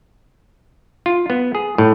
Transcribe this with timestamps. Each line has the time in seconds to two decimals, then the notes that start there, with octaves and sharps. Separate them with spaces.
1.06 F4
1.30 B3
1.55 G#4
1.78 A2